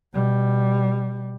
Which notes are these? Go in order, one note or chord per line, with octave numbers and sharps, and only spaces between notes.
B2 G3